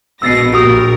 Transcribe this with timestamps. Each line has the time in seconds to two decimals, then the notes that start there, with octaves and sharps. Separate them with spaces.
0.22 A#1 B2 E6 A6 A#6 C7
0.53 A#1 F#4 G4 A#4 D#6